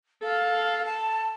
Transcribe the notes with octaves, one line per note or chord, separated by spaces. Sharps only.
A4 F5
A5